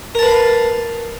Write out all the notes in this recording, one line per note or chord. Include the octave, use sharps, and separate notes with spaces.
A#4 B4 F5 A5 B5